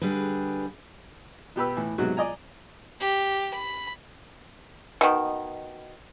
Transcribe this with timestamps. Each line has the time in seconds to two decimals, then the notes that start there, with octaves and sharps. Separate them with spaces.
0.02 D3 G3 G#4 B4
1.56 B2 G4 B4 E6
1.77 A2 E3
1.98 G#2 C3 F#3 G#3 B3 F#4
2.17 D5 D#5 G#5 A#5
3.01 G4
3.54 B5
5.01 B2 D#3